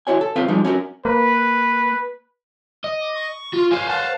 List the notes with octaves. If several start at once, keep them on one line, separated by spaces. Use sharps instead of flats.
E4 F#4 C#5 G#5
A4
C4 F4 B4 F5
F3 G3 G#3 D#4 F4
C#4 F#4 A4 A#4
A#3 B4
D#5
D6
C#6
F4 C6
B4 C5 F5 G#5
F5 F#5 A5